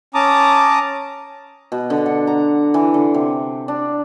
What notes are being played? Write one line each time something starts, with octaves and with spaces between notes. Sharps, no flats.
C#4 A5 A#5 D6 D#6
B2
D3
F#5
A#5
E3
D3
C3
D4